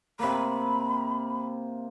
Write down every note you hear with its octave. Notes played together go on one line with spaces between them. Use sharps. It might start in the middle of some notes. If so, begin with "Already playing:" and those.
C3 A#3 B5